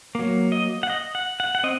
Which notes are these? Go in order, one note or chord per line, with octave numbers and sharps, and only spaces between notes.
F#3 A#3
D#5
F#5
D#5
F#5
F#5
F#5
C4 D#5